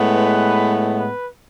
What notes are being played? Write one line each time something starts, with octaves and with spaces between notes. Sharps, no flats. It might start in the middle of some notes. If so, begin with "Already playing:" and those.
Already playing: A2 G#3 B3
B4
B4